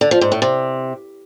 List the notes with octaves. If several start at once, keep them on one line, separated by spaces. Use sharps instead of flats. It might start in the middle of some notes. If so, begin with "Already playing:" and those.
D3
F3
G#2
A2
C3